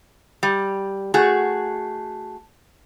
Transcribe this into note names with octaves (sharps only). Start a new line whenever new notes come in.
G3
A3 F#4 G#4